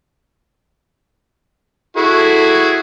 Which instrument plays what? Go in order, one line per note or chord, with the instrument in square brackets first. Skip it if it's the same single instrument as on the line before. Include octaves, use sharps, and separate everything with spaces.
[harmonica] E4 F#4 G#4 [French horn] A4